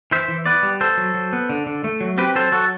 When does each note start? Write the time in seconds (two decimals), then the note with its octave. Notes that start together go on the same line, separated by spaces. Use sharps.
0.11 E3 C5 E5
0.28 E3
0.46 B3 B4 D5
0.63 G3
0.80 B3 A4 C5
0.97 F#3
1.14 F#3
1.33 B3
1.49 D3
1.66 D3
1.84 A3
2.01 F#3
2.18 C4 G4 B4
2.35 F#3 A4 C5
2.52 F#3 F#4 A4